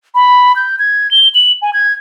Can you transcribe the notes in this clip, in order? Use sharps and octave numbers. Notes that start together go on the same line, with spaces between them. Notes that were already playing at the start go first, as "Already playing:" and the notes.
B5
G6
G#6
G7
F#7
G#5
G#6